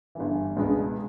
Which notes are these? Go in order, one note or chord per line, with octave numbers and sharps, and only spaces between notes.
G1 G2 E3
C#2 B2 G#3 B3 D4